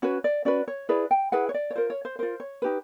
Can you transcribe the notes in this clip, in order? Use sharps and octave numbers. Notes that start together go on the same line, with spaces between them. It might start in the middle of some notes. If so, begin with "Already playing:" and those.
C#4 F#4 B4 C#5
D5
C#4 F#4 B4 D5
C#5
E4 G#4 B4 D5
G5
E4 G#4 B4 F#5
C#5
D5
C#5
F4 A#4 C5
C#5
C5
F4 A#4 C5
C#5
D#4 G4 B4